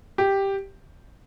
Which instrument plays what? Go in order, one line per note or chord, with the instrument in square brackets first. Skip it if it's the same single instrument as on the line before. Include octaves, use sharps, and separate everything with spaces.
[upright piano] G4